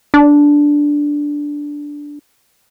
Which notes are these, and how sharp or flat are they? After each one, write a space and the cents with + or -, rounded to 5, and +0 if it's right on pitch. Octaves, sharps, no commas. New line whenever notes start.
D4 -5